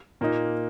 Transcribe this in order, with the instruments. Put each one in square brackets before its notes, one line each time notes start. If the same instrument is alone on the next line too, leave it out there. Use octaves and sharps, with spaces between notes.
[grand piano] A#2 A#3 D#4